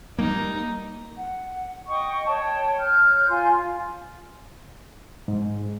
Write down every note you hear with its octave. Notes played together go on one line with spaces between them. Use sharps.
G3 A#3 D#4
F#5
D#5 G5 C#6 D#6
C#5 G5 A5
C#5 F6 G6
F4 G#5 C6
G#2